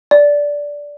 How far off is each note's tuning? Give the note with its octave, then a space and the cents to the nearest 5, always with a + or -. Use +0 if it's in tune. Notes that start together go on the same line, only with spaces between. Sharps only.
D5 -10